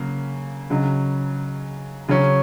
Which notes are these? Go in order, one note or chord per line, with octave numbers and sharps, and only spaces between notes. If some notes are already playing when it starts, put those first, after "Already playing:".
Already playing: C#3 F#3 A#3
C#3 F#3 D#4
C#3 F#3 C#4